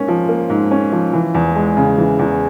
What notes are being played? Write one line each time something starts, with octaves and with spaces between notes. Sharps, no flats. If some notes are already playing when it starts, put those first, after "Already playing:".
Already playing: G#2 A#3 C#4
F3
A#3
G#2
C#4
F3
E3
E2
G#3
C#3
E3
E2